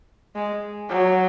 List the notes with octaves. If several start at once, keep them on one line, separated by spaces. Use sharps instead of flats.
G#3
F#3